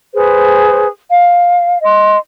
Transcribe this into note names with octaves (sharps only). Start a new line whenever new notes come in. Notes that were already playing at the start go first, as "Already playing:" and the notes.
G#4 B4 C5
F5
D#5 C6